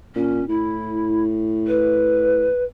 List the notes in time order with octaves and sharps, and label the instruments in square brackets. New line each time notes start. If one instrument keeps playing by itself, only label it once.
[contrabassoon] A#2 [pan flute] C#4
[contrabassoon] A2 [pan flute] E4
[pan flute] B4